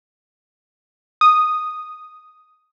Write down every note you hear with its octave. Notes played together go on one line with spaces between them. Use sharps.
D#6